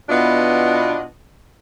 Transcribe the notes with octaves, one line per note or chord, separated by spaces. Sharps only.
B2 B3 D4 E4 F4 D#5